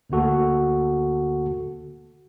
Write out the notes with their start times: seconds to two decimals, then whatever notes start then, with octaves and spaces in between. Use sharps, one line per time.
0.10 D2 D3 A#3 F#4 A4